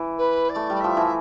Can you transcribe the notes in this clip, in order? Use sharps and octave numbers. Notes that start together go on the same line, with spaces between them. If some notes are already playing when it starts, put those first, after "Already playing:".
Already playing: E3
B4
D5
A3
G3
F3 E5
E3